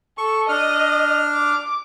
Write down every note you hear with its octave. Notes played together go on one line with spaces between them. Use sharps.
A4 C#6
D4 D#5 F6
D6